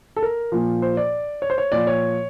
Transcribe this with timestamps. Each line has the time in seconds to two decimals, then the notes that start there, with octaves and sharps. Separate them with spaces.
0.16 A4
0.22 A#4
0.52 A#2 F3
0.82 C5
0.97 D5
1.42 C#5
1.50 C5
1.58 C#5
1.72 A#2 F3 D5
1.87 C#5